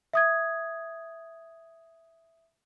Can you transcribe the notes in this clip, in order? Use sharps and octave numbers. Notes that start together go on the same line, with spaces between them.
E5 D#6 G#6